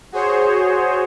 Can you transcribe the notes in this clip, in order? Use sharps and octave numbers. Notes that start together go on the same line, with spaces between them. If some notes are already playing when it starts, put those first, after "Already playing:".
F#4 G#4 C5 C#5